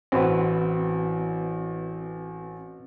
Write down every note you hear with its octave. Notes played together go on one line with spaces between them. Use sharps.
A1 C4 F#4 B4